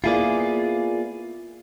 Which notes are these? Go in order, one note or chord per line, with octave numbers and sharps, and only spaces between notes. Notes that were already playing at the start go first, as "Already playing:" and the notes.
A#3 B3 E4 F4 G#4 D5